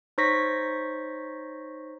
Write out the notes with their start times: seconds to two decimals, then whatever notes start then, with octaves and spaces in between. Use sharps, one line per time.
0.18 D#4 C5 C#5 C#6 A#6 B6